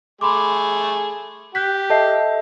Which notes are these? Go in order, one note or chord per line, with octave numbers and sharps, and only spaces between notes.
A3 G#4 B5 C6 D6
G4 F#6 G6 B6
A4 D#5 E5 A5 G6 C7